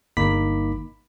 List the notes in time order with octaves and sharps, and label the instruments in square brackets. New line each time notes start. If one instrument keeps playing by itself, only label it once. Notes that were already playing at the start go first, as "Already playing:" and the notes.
[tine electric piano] G1 A#3 D#4 B5 D6 B6